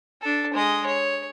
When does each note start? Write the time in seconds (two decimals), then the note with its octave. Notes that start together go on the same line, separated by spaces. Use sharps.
0.21 D4 A4
0.54 G#3 D#5
0.86 C#5